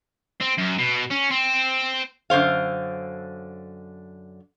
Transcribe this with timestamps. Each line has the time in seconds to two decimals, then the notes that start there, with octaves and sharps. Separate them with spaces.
0.40 C4
0.58 F#2
0.78 B2
1.11 C#4
1.31 C4
2.30 F#2 D3 C5 F5